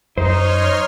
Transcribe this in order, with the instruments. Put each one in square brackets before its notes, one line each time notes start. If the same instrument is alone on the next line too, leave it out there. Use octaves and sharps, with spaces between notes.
[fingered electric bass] F#2 [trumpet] D#4 [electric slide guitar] C5 [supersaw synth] C#5 C6 F6